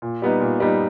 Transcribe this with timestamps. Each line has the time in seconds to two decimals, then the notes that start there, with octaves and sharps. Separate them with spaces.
0.02 A#2
0.22 G3 B3 D#4
0.40 A#2
0.60 G3 B3 D#4